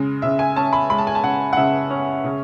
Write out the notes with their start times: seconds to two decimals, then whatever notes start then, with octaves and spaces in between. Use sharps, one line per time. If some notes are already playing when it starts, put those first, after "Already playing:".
Already playing: C#3 G#3
0.22 C#3 E5
0.39 G#5
0.56 C#4 A5
0.73 B5
0.89 G#3 B5
0.98 A5
1.07 G#5
1.15 A5
1.23 C#3 F#5
1.53 F#5
1.57 C#3 E5
1.90 C#4
2.24 C#3